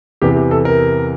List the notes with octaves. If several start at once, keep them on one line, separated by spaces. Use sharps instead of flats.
E2 C3 E3 G4
G4
A4
A#4